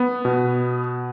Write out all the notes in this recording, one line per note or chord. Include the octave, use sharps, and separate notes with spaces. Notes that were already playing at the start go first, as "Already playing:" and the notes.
Already playing: B3
B2